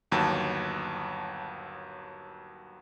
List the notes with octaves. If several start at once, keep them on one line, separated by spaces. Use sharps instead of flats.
G1 D#2 F#3 A5